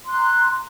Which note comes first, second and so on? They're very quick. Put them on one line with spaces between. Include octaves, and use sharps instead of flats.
C6 F#6 A#5